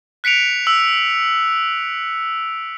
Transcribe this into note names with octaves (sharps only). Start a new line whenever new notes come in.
F#6 B6 C#7 D7 F7
E6